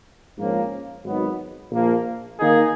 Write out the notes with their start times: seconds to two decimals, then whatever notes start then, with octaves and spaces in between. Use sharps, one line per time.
0.38 A#1 G#2 F3 A#3 C#4
1.04 G#1 G#2 F#3 B3 D#4
1.71 A#1 A#2 F3 A#3
2.38 D#3 A#3 D#4 G#4